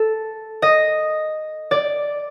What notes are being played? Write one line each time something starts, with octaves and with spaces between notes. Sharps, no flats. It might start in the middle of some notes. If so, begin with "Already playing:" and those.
Already playing: A4
D#5
D5